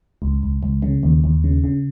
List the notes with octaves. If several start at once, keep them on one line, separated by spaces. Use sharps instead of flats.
C#2
C#2
C#2
C#3
D#2
D#2
C#3
C#3